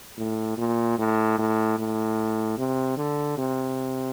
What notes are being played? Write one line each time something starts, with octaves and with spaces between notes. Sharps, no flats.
A2
A#2
A2
A2
A2
C3
D3
C3